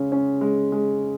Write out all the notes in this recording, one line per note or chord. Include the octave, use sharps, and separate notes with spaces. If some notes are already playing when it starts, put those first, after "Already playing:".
Already playing: C#3 G#3 C#4
C#4
G#3
G#3